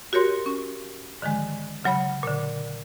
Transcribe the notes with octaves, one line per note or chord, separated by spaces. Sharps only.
F#4 G4 A#4 C#5 C6
C#4
G#2 D3 D#3 F3 G#3
C#3 F#3 C#5 B5
A#2 D3